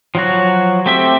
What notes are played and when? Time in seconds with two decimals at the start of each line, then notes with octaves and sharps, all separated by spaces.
0.15 F3 F#3 F#4
0.86 A3 C4 G4 C5 E5